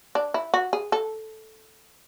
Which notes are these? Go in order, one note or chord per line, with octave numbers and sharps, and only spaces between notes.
D4
E4
F#4
G#4
A4